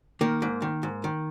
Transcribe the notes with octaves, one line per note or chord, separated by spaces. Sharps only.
D#3 A#3
G#2
D#3
G#2
D#3